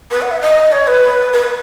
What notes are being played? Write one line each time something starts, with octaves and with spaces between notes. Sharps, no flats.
B4
F#5
E5
D#5
C#5
B4
B4